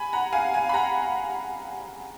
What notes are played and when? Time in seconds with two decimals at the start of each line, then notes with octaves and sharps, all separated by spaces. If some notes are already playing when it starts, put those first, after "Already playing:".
Already playing: G#5 B5
0.13 F#5 A#5
0.33 F5 G#5
0.54 F5 G#5
0.69 B5
0.74 F#5 A#5